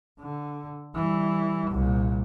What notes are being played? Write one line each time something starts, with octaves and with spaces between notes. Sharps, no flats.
D3
E3 G3
C2 A#2